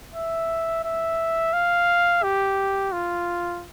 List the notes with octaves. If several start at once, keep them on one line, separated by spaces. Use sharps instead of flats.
E5
E5
F5
G4
F4